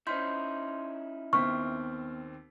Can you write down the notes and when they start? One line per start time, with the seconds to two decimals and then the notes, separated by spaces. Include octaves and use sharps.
0.07 C#4 D#4 E4 C5 C6 F6 G6 B6
1.33 D#2 B3 C4 C#6 F6 B6